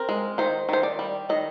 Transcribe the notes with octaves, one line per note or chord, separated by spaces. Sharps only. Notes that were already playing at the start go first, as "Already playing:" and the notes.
Already playing: C4 A#4
G#3
D#3 C5
D#3 C5
D5
G3
D#3 D#5